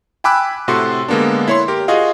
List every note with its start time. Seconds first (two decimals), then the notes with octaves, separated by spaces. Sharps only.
0.24 G5 G#5 B5 D6 E6 F#6
0.68 A2 C3 F#4 A4 C6
1.08 D3 G#3 A#3 B3 D4
1.48 E4 C#5 C6
1.68 G4 A#4
1.88 F4 F#4 G#4 D#5 F5